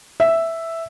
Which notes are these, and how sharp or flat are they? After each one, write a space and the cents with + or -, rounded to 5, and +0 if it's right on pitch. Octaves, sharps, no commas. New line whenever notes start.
E5 +0